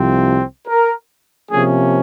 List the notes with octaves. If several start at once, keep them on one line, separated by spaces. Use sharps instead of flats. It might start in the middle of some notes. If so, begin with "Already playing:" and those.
Already playing: C2 C3 F3 C4
A#4
C3 F3 A#3 C#4 G#4